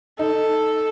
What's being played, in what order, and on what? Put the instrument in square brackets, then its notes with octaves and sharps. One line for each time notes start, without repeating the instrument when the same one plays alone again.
[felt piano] D#4 [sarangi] A4